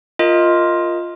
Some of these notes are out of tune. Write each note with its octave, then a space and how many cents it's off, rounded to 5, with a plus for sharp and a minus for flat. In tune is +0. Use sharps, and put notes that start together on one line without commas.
F4 +0 A#4 +0 D#5 +15